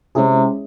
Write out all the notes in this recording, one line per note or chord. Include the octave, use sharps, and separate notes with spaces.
C3 G#3 C#4 E4 G#4